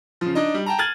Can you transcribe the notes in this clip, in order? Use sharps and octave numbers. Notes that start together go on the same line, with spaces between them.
C#3 F3
D4 D#4 D#5
G3
G5 A5 A#5
F6 G#6 A6 D#7 F#7